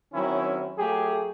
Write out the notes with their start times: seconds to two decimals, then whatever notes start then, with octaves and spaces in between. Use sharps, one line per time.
0.14 D#3 F#3 C4 C#4 E4
0.78 F#3 A3 G4 G#4